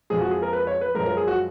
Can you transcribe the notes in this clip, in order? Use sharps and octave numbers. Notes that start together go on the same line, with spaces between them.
F2 F3 G#3 G#4
F#4
G#4
A#4
B4
C#5
B4
F#2 F3 G#3 A#4
A#4
G#4
F#4